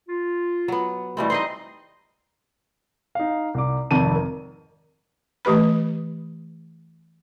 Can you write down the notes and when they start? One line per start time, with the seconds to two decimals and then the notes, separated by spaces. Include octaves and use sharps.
0.09 F4
0.68 F#3 B3
1.17 B2 E3 G3 A3 C4
1.30 C4 D#4 D#5 C6
3.15 D#4 F5
3.54 C2 D6
3.91 G#1 F2 C3 A5 D#7
4.16 A#4
5.45 E3 A3 G4 B4 B5